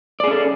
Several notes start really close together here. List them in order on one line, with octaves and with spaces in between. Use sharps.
D5 G#4 C#4 A4